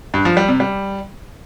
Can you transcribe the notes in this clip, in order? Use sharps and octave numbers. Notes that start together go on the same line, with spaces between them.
G2
F3
G3
C3
G3